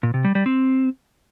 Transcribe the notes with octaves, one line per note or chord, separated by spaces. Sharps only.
A#2
C3
G3
G3
C4